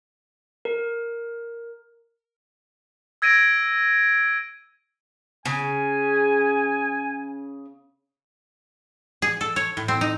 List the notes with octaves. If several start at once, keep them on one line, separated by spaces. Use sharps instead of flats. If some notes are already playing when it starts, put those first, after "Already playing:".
A#4
E6 G#6 A#6 D7 D#7
C#3 G#5
G#4
A4
C#5
A2
C4
D#4